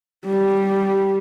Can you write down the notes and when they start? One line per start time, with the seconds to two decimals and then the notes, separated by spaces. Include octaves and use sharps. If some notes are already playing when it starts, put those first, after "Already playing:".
0.25 G3